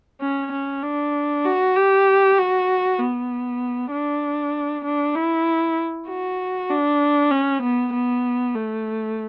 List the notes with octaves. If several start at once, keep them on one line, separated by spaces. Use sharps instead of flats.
C#4
C#4
D4
F#4
G4
F#4
B3
D4
D4
E4
F#4
D4
C#4
B3
B3
A3